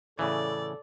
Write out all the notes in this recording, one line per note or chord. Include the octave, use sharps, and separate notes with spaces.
A2 C#3 E3 A4 D5